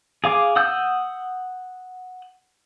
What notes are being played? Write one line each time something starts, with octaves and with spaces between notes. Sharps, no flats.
G#4 F5 D6
F#5 D#6 E6 G6